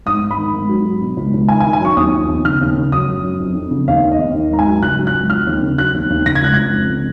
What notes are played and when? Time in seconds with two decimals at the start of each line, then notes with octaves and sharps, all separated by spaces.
0.06 G#2 D#6
0.21 G#2
0.31 B5
0.37 D#3
0.54 G#2
0.69 F#3
0.86 F#3
1.02 B2
1.17 C#2
1.34 C#2
1.48 D#3 G#5
1.60 G#5
1.64 D#3
1.73 G#5
1.81 F#2 C#6
1.97 D#2 D#6
2.12 F3
2.28 D#2
2.45 C#3 F6
2.61 D#2
2.77 C#3
2.92 F#2 D#6
3.08 F#2
3.23 F#2
3.40 F2
3.55 F2
3.71 C#3
3.88 D#2 F5
4.04 D#3
4.11 D#5
4.18 D#2
4.34 D#3
4.51 G#2 A#5
4.59 G#5
4.67 F#3
4.82 C#2 F#6
4.99 F#3
5.07 F#6
5.14 C#2
5.30 F3 F6
5.47 D#2
5.62 C#3
5.78 F#3 F#6
5.94 D#2
6.10 D#2
6.26 C#3 A#6
6.35 G#6
6.42 C#2 F#6
6.54 C#2 G#6
6.73 F2
6.89 C#3